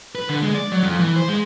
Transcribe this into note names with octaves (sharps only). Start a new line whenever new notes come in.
B4
D3
G#3
D5
F#3
F2
E3
C5
G#3